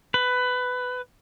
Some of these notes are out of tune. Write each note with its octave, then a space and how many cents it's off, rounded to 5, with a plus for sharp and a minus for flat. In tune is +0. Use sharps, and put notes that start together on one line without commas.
B4 +15